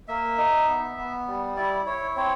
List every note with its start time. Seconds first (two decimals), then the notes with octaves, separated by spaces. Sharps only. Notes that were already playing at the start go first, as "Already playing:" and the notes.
0.08 A#3 E5
0.38 D#4
0.68 B3
0.97 B3
1.27 G3
1.57 E4 D5
1.86 E4 C#5
2.16 C4 C#5